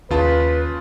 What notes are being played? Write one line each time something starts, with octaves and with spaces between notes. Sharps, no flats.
D#2 C#3 F4 B4 A5